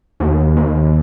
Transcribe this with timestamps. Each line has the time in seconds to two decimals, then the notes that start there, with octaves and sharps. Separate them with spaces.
0.20 D#2
0.57 D#2